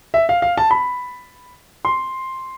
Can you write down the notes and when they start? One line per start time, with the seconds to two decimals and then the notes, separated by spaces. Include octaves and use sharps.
0.14 E5
0.29 F5
0.42 F5
0.58 A5
0.71 B5
1.85 C6